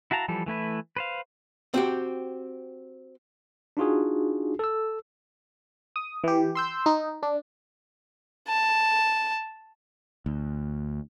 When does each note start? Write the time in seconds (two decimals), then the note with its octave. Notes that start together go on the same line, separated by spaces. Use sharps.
0.11 E4 F#4 F5 A5 A#5
0.28 E3 F3 G3 A4
0.46 E3 A3 E4 B4
0.97 B4 C5 F5
1.74 C4 F#4 G4
3.77 D4 D#4 F4 F#4 G#4
4.59 A4 E6
5.96 D#6
6.24 E3 G4
6.55 C6 E6 G6
6.86 D#4
7.23 D4
8.48 A5
10.26 D2